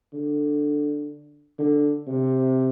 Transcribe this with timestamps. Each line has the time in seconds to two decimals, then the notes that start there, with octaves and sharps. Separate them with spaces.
0.14 D3
1.59 D3
2.08 C3